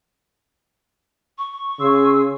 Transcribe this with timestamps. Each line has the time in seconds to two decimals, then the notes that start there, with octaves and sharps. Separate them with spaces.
1.38 C#6
1.80 C#3 G#4 C6 E6